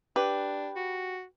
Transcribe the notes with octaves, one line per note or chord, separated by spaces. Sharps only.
D4 G4 B4
F#4